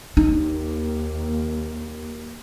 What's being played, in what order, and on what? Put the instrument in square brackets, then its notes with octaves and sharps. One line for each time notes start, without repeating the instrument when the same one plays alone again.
[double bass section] D#2 A#3 [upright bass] D#4